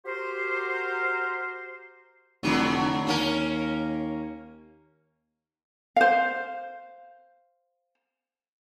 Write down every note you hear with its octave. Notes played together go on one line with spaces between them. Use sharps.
F#4 G4 A#4 C5
F1 G#2 D3 F#3
D#2 A#3 C#4 A#4
C5 F5